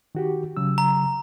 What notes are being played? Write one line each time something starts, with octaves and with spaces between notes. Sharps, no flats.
D#3 F#4 G4
C#3 F#3 E6
A#5